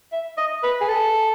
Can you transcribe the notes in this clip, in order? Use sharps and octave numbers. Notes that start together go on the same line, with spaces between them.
E5
D#5
B4
G#4
A4